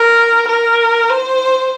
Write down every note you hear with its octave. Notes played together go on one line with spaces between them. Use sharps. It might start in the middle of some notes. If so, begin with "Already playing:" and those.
Already playing: A#4
A#4
C5